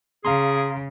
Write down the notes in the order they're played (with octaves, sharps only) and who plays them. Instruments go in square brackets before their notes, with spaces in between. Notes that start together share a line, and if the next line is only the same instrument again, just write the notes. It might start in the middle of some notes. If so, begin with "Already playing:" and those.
[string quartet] C#3 [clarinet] G#4 [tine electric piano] F5 A#5 C6